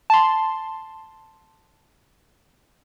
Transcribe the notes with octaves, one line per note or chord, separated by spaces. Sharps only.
A5 C6